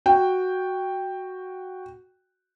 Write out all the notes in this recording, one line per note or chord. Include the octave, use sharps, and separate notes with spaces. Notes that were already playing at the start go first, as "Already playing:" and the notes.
F#4 G5